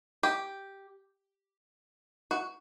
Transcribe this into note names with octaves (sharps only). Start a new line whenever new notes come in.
G4
F#4